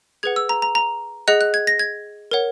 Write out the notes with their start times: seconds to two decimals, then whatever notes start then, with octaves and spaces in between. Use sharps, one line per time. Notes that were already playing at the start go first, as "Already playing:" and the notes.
0.23 G#4 B4 F#5 G#6
0.36 E6
0.49 A#5
0.62 A#5
0.75 A#5
1.28 G#4 D#5 F#5 F#6
1.41 F#6
1.54 G#6
1.67 A#6
1.79 G#6
2.31 A#4 C#5 F#5